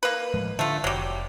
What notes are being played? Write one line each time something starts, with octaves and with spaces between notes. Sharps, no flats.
A#3 B4
A2 F3 G#3
D3 A3 F4
F1 F#3 G3